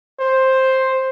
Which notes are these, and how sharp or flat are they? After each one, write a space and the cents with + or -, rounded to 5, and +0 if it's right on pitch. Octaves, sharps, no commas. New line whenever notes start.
C5 +5